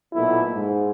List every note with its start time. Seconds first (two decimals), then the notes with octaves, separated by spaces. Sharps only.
0.13 B1 A#2 A3 E4
0.53 G#2